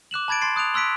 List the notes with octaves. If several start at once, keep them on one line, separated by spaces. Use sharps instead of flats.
D6 F#6 E7 F#7
A5 B5 G#6 A6 D7
C6 A6 C7 D7
D#6 F#6 D7 F7
C6 E6 F#6 B6 D7